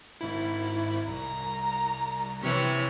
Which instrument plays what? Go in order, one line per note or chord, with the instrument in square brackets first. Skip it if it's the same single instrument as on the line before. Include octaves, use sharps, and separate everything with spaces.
[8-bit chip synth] G#1 G#2 E4
[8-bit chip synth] C2 [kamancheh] A#5
[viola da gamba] C3 E3 C#5